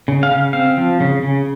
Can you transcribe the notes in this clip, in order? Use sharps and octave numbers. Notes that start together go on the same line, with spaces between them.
C#3
F5
C#3
C4 F5
F3
C#3
C#3